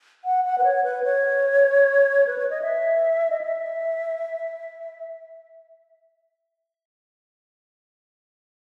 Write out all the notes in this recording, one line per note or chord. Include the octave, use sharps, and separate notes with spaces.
F#5
F#5
B4
C#5
B4
C#5
B4
C#5
D#5
E5
D#5
E5